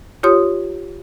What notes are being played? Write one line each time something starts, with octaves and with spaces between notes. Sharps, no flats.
F4 G4 C#5 C6 D#6